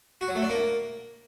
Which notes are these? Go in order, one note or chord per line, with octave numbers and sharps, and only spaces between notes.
F#4
F#3
A3
D4
A#3